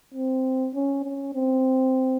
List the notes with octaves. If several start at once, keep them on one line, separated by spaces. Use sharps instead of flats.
C4
C#4
C#4
C4